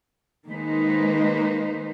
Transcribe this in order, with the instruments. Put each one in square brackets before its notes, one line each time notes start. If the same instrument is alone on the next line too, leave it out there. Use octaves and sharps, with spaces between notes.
[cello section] D#3 G#3 A#3 D#4 B4 C5